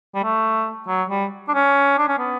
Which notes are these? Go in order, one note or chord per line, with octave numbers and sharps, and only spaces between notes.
G3
A3
F#3
G3
D4
C#4
D4
C#4
B3